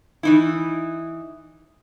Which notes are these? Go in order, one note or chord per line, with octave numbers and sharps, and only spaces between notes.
E3 D#4 E4